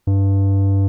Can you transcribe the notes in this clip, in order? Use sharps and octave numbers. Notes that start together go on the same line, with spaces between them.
G2